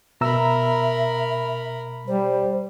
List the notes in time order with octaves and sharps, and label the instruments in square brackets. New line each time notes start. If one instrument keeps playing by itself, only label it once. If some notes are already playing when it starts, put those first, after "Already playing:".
[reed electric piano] B2 A#5 E6 [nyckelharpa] A#4 B5 [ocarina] E5
[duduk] G3 [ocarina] C5